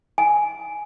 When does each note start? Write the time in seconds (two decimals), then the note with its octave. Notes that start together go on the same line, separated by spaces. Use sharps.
0.18 G#5